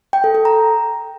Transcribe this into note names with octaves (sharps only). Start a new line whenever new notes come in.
G5
A4
A4
A#5